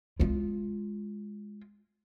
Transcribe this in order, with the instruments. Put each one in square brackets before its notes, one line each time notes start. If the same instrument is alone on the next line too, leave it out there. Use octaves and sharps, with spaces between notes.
[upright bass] G#3 F4